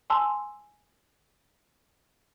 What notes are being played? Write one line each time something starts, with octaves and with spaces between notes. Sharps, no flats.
G#5 A5 C6 E6